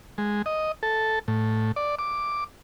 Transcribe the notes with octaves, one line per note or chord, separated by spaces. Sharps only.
G#3
D#5
A4
A2
D5
D6